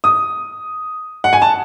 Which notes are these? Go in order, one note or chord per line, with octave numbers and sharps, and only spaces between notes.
D#6
F#5
G#5
A5